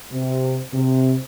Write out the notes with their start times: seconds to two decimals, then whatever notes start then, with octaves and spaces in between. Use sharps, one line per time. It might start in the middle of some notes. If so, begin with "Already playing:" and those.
0.12 C3
0.73 C3